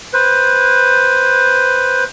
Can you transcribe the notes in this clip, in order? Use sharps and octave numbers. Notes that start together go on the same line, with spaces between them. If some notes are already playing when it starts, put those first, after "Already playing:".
B4 C5